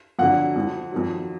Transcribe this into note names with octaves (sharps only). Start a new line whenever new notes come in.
F2 D3 F#3 F#5
F2 F3
F2 D#3 F#3